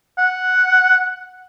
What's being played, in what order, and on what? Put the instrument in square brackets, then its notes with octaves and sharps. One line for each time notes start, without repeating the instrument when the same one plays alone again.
[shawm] F#5